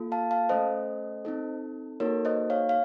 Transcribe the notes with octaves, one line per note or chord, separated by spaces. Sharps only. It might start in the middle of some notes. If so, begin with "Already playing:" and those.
Already playing: A#3 F4 A4
F5 A5
F5 A5
A3 C#4 A4 C5 D#5
C4 D#4 A4
A#3 D#4 F#4 A4 A#4 C#5
C5 D#5
C#5 F5
F5